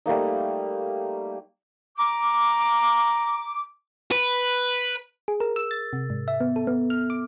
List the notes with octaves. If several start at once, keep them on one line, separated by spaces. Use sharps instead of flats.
G3 A3 A#3 D#4
A#5 D6
B4
G#4
A#4
E6
A6
C3
G#2
E5
B3
A4
B3
F6
D6